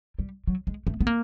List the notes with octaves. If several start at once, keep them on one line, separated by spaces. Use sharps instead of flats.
G3
F#3
G#3
A3
B3
A#3